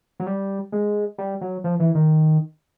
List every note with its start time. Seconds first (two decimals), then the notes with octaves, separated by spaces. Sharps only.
0.20 F#3
0.27 G3
0.72 G#3
1.18 G3
1.41 F#3
1.64 F3
1.80 E3
1.95 D#3